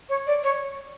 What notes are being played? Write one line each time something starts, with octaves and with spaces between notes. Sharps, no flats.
C#5
D5
C#5